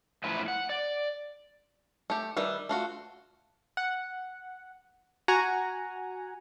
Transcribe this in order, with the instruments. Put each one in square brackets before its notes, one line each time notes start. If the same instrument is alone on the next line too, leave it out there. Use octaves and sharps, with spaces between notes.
[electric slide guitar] F#2 A2 F3 E4 B4
F#5
D5
[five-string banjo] A3 G4
D#3 G3 B4 E5
A3 F4 F#4
[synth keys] F#5
F#4 F#5 G#5 A#5